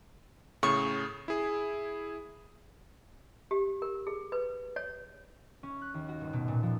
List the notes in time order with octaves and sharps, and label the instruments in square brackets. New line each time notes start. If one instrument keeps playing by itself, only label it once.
[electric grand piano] A2 C#3 [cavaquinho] C#6
[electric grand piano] E4 G#4
[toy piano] G4
A#4
G#4
B4
C#5
[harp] C#4
F#6
D#2
F#4
G1
B2
A#2
F3